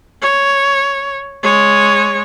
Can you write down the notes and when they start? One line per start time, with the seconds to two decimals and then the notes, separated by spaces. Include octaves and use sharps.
0.22 C#5
1.43 G#3 C#5